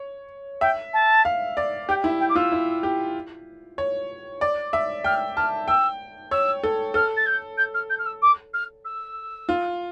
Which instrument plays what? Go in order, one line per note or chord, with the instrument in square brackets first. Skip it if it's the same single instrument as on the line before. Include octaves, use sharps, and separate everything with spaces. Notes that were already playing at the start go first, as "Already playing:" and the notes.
Already playing: [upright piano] C#5
[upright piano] E5 [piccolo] G5
[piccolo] A5
[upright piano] F5
D5
[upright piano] G4 [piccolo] G5
[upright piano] E4 [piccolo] E5
[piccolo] G5
D6
[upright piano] F4 [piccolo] E6
[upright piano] E4
G4
C#5
D5
E5
[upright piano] G5 [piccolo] F6
[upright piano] A5 [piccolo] F6
[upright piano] G5 [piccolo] E6
[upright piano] C#5 [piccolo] E6
[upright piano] A4
[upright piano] A4 [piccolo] F6
[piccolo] A6
G6
G6
F6
G6
F6
E6
D6
F6
E6
[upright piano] F4